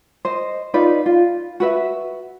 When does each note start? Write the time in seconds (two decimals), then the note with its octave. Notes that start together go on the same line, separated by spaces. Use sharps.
0.25 C5 D#5
0.74 D#4 F4 B4 D5
1.06 F4
1.60 F#4 B4 E5